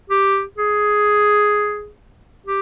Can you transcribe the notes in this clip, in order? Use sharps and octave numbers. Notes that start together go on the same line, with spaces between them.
G4
G#4
G4